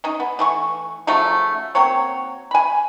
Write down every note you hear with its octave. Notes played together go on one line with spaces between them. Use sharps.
C#4 D#4
B3
E3 A3 C#6
C#3 F3 F#3 A3
F#3 A#3 C4 C#5
G#5 B5